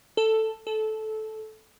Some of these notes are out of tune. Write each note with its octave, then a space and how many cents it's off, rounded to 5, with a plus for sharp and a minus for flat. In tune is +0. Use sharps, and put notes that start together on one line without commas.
A4 +5
A4 -15